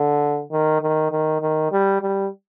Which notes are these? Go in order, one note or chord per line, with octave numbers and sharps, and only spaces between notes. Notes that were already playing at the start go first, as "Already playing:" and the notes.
Already playing: D3
D#3
D#3
D#3
D#3
G3
G3